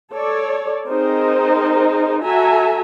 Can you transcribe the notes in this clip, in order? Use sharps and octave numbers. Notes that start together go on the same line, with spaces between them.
A4 C#5 D5
C4 D#4 G#4 A#4 C5 D#5
F#4 A4 E5 G#5 A#5